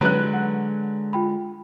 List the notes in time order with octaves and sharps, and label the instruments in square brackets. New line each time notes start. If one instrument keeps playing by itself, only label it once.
[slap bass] D3 G#3 [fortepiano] F#3 B4 F#6 [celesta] B5
[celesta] F#5
F4 G5 B5